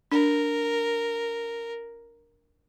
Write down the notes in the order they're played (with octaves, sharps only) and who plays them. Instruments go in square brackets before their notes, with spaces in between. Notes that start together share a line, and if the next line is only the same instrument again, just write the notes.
[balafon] D4 [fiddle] A#4